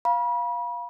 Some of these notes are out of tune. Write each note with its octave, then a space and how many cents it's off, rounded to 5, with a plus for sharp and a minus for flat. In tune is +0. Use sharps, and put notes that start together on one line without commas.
F5 +0 B5 -35